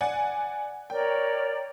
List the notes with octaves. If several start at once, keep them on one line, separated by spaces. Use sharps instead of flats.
D5 F#5 G#5
A#4 C#5 D5 G5